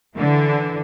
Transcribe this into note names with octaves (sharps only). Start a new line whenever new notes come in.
D3 E3